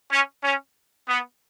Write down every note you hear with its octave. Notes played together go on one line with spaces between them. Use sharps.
C#4
C#4
B3